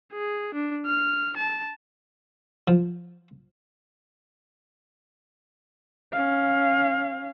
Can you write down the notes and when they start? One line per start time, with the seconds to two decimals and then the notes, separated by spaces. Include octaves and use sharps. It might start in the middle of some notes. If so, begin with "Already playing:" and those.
0.12 G#4
0.54 D4
0.86 F6
1.36 A5
2.68 F3
6.13 C#4 F5